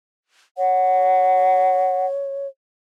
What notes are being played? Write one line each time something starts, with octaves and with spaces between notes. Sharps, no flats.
C#5 F#5